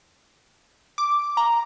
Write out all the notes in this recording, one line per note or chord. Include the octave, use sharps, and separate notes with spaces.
D6
A#5